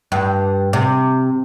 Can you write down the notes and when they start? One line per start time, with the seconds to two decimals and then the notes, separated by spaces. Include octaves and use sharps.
0.12 G2
0.73 C3